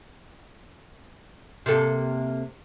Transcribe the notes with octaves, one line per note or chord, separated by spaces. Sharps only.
C3 A#3 A4